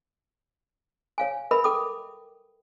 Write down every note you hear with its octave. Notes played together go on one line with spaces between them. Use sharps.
C#5 F5 G#5
A#4 B4 D#5 E5 B5
A4 G5 D6 D#6